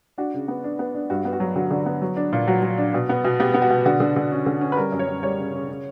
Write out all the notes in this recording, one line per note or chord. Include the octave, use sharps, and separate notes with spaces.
D4 F#4
C#3
B3
D4
B3
D4
G2 F#4
B3
F#4
F#3
D3 F#4
D3
B3
F#3
D4
A#2
F#3 F#4
F#3
D4
B2
B3
B2
B3 G4
B3
F#4
B2
D3 F#4
D3
D3
C#4
D3
C#4
B4
G3 A#4
F#2
C#5
F#2
G3 C#5
C#3
C#3
C#3